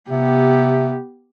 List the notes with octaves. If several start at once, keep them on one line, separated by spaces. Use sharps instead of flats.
C3 B3 G4